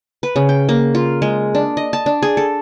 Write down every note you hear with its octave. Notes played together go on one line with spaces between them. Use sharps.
B4
C#3
G5
A#3
F4
G#3
D4
D#5
A5
D4
G#4
A4